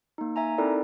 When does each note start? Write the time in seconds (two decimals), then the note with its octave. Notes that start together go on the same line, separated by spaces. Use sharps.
0.18 A#3 D#4
0.36 E5 G#5 A#5
0.58 C4 D#4 E4 A4 A#4 D5